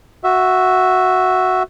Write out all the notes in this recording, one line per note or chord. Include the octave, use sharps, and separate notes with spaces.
F#4 E5